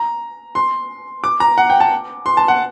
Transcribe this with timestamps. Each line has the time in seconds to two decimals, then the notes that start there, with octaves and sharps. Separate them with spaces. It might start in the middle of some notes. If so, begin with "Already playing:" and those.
Already playing: A#5
0.55 C6
1.24 D6
1.40 A#5
1.58 F#5
1.70 G5
1.80 A5
2.26 C6
2.37 A5
2.48 F#5